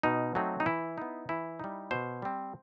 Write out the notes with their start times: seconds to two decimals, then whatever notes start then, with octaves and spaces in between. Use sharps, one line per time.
0.03 B2 D#4
0.35 F#3 A3 C4 D#4
0.60 D#4
0.66 E3 E4
0.98 B3 D#4
1.29 E3 E4
1.60 G3 D#4
1.91 B2 C5
2.22 G3 C4